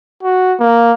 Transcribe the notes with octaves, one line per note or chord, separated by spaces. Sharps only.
F#4
A#3